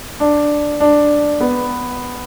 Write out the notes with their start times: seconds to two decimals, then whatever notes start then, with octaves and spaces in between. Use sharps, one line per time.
0.20 D4
0.80 D4
1.40 B3